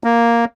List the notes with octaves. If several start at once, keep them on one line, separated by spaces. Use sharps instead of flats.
A#3